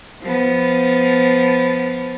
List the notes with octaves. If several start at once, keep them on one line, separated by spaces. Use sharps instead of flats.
F3 B3